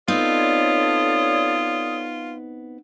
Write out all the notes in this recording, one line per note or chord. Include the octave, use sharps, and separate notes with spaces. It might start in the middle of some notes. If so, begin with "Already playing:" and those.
B3 C4 D#4 F4 A4 C#5 D5 D#6